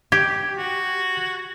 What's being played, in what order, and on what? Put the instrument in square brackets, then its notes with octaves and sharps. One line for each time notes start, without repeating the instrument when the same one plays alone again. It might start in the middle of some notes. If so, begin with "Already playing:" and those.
[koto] G4 [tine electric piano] G#6
[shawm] F#4